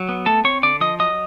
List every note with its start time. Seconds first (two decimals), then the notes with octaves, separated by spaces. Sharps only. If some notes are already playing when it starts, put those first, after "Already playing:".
Already playing: F#3
0.09 B3
0.26 A3 A4 A5
0.44 C4 C#5 C#6
0.63 D3 D5 D6
0.81 F3 D#5 D#6
0.99 F#3 D#5 D#6